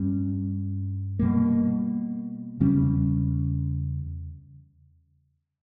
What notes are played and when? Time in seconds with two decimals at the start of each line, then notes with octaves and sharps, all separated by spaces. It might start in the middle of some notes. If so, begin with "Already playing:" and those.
Already playing: G2 G3 C#4
1.19 B2 G3 A#3
2.60 E2 C#3 G3 C#4